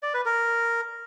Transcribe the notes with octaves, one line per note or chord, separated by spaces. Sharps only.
D5
B4
A#4